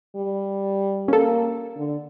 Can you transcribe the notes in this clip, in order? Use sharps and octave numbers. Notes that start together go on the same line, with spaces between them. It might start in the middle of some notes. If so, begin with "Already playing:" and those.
G3
A#3 C#4 A4
D3